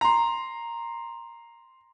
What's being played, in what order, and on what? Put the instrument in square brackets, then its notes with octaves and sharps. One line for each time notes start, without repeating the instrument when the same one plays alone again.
[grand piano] A#5 C6